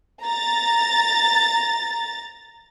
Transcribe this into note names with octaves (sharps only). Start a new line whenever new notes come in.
A#5 A6